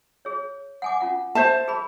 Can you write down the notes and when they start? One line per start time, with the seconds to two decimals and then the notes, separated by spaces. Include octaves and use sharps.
0.25 G#4 C#5
0.82 F#5 G#5 D6
1.01 C#4 F4 F#5
1.35 C5 E5 A5
1.68 G#4 A#4 B5